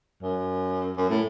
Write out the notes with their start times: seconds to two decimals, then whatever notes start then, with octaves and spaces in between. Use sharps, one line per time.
0.22 F#2
0.97 F#2
1.10 A2